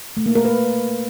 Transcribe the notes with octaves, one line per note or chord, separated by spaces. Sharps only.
A3
A#3
A#4
B4